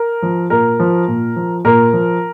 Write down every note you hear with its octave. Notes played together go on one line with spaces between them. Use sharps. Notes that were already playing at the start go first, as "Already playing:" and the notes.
Already playing: A#4
F3
A#2 A#4
F3
A#2
F3
A#2 A#4
F3